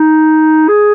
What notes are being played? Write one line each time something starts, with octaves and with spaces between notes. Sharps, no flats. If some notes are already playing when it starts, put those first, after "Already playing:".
Already playing: D#4
G#4